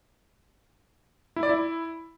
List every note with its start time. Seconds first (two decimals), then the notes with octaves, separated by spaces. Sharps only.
1.36 E4
1.43 D5
1.49 E4